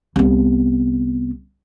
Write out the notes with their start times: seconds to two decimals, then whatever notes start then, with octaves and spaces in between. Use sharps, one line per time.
0.16 C2 B3